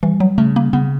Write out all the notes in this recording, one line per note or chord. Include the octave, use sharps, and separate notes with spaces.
E3 G3
F#3
C#3 A3
A#3
C#3 B3